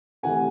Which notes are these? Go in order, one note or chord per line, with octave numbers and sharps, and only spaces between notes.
C3 E3 A3 F#5 G#5